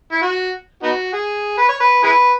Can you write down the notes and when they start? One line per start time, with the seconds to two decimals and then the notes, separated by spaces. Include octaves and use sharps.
0.12 E4
0.22 F#4
0.83 B3 D#4 F#4
1.13 G#4
1.57 B4
1.69 C#5
1.80 B4
2.03 E4 G#4 B4